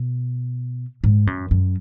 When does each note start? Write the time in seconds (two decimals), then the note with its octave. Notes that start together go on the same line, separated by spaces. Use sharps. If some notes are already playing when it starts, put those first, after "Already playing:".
Already playing: B2
1.04 G#2
1.27 F#2
1.51 F#2